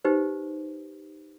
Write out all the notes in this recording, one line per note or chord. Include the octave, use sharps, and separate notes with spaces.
D#4 G4 B4 C5